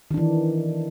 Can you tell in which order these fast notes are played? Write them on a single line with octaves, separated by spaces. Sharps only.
D#3 D4 E3